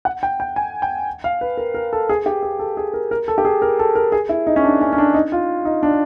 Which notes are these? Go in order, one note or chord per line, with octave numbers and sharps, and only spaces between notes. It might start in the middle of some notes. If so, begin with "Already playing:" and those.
F#5
G5
G5
G#5
G5
F5
B4
A#4
A#4
A4
G#4
G4
G#4
A4
G#4
A#4
A#4
A4
G4
G#4
A#4
A4
A#4
G#4
E4
D#4
C#4
D4
C#4
C#4
D4
D#4
F4
D#4
D4